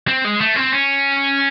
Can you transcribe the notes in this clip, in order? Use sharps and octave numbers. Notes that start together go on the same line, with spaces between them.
C4
G#3
A3
C4
C#4